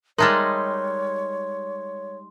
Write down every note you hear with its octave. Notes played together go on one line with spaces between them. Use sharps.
G3 G#3 D#4 A#4 C#5 E5 A5 C6